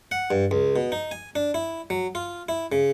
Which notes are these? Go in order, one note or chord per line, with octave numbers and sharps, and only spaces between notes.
F#5
G2
C#2
B2
D#4
G#5
D4
E4
F#3
F4
E4
C#3